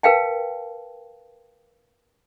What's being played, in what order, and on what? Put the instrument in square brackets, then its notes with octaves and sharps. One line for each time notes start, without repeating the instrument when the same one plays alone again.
[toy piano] A#4 B4 F5 G5 A5